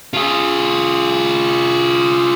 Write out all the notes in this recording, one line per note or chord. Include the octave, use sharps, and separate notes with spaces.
F4 G#4